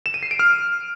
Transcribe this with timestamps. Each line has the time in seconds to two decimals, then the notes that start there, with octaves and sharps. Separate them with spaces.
0.06 E7
0.14 D#7
0.23 C7
0.31 D7
0.39 F6